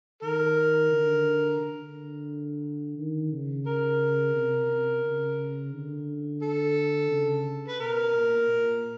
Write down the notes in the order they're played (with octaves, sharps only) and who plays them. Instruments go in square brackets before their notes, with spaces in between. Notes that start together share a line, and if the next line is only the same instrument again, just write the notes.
[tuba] D#3 [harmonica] A#4
[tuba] D3
D3
D#3
C#3
[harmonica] A#4
[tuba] C3
C3
C#3
D3
[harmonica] A4
[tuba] C#3
[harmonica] B4
[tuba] B2 [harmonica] A#4
[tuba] A#2
A#2